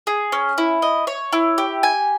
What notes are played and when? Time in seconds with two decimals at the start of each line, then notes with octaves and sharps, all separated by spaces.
0.07 G#4
0.32 C#4
0.58 E4
0.82 D#5
1.07 C#5
1.32 E4
1.58 G4
1.83 G#5